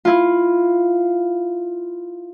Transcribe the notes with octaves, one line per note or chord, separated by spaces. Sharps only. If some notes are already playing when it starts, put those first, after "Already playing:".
E4 F4